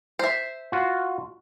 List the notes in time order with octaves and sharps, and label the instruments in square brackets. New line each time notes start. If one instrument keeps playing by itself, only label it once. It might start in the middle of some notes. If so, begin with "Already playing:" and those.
[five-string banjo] C5 E5
[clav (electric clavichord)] F4 F#4